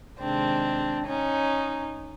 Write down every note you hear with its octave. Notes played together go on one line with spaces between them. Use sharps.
C3 D#3 G#3 C4 D4
C#4 D#4